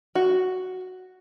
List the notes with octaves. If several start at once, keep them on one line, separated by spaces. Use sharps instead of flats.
F#4